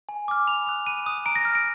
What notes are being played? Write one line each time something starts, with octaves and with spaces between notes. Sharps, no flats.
G#5
D6 F6
B5 F7
D#6 F#6 F7
B5 D#7
D#6 F#6
A#5 D7
A#6
F6
D7